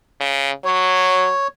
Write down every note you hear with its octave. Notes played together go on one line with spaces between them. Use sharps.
C#3
F#3 C#5